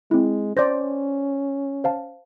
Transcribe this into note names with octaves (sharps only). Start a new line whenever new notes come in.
G#3 C4 E4
C#4 C5 D5 G6 A#6
C5 F5 A5